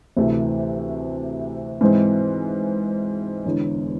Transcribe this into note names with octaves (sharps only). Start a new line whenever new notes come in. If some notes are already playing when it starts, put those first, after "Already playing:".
D2 C3 E3 A3
G#2 E3 G#3 C4
E1 E2 D3